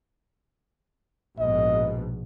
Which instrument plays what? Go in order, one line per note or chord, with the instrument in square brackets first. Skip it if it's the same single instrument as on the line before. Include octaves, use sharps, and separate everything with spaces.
[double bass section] A#1 G#2 B2 [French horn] D#5